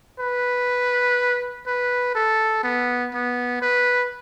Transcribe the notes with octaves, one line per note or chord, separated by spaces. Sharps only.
B4
B4
A4
B3
B3
B4